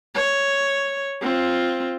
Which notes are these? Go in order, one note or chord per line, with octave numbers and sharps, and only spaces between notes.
C#5
C4 F4